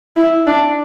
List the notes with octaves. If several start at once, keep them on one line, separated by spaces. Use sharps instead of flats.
E4
D4